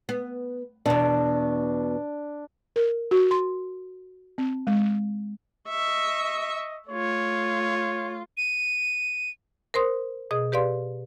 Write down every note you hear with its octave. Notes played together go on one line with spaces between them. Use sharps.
B3
E2 B2 D4
A#4
F#4
C6
C4
G#3
D#5 E5 C#6
A3 F4 C#5
D#7
A#4 C5 C6 D#6
B2 G#4 D#5 D#6
G4 B4 D5 F5 C6